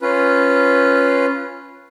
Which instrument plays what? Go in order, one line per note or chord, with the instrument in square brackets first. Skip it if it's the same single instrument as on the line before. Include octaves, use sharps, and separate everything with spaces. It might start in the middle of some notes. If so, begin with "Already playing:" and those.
[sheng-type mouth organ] C#4 F4 B4